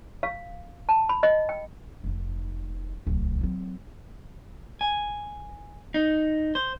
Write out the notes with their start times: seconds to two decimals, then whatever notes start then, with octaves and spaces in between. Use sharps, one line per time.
0.23 F5
0.89 A5
1.09 B5
1.23 D#5
1.49 G5
2.04 F1 D#4
3.07 D1 C2
3.41 F#3 C4
4.81 G#5
5.94 D#4
6.55 C5